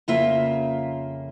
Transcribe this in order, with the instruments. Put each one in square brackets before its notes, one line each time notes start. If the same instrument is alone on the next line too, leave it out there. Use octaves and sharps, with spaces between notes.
[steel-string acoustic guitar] F2 C#3 A#3 F4 E5